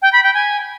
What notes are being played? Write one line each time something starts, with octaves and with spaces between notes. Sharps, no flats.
G5
B5
G5
G#5